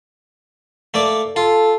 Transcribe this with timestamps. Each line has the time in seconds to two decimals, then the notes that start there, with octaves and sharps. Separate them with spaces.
0.94 A3 A#3 D5
1.36 F4 A4